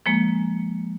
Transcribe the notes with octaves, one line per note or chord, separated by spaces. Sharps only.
F3 G#3 A#3